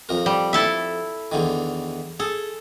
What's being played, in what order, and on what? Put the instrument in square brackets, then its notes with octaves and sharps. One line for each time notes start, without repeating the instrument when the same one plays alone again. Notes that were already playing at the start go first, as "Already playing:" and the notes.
[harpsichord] F2 A#4
[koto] G3
E4 A4 E5
[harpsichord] E2 D3 D#3
[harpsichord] G#4 [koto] A4